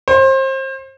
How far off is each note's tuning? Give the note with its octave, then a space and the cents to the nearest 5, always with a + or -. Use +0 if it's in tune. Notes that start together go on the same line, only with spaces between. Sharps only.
C5 +30